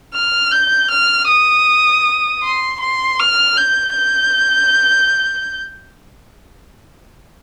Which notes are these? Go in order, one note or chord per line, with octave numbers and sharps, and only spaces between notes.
F6
G6
F6
D#6
C6
C6
F6
G6
G6